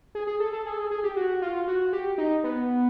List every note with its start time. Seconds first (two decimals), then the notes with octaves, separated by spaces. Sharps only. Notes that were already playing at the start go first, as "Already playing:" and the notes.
0.15 G#4
0.27 G#4
0.40 A4
0.53 A4
0.66 G#4
0.73 A4
0.79 G#4
0.91 G#4
1.04 G4
1.16 F#4
1.42 F4
1.67 F#4
1.93 G4
2.18 D#4
2.44 B3